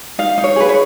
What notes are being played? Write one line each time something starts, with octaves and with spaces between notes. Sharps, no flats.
D#4 F5
D#4
C#5
G#4 B4
C#5